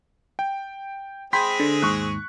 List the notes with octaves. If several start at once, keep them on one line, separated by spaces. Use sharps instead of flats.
G5
G#3 C4 G#4 G5 B5 C6 B6
D3
D#2 G#2 C#6 F#6